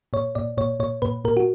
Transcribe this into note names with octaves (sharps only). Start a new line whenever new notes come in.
A#2 C#5
A#2 D5
A#2 C#5
A#2 C#5
A#2 B4
A#2 A#4
F#4